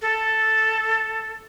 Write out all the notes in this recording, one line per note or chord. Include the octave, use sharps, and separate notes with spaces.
A4